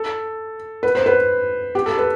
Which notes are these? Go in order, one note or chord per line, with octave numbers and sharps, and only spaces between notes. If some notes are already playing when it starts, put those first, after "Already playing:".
Already playing: A4
B4
C5
B4
G4
A4
B4